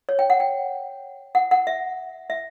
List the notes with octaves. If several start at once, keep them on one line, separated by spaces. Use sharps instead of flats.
C#5
G5
F#5
G5
F#5
F#5
E5
E5